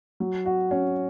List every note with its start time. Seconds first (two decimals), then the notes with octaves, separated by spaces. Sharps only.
0.20 F#3
0.45 F#4
0.71 C#4